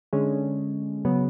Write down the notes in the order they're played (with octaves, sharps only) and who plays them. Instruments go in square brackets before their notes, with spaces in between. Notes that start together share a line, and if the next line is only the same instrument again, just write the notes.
[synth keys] D3 G#3 C#4
C#3 F#3 B3